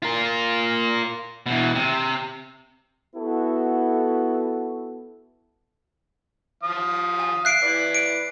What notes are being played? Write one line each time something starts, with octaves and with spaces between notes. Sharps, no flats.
F4 A#4
B2 E3
C3
B3 E4 F#4 A4
F3 F5 D#6
G#5
E5 F#6 C7 D7
E4 B4 D5
D7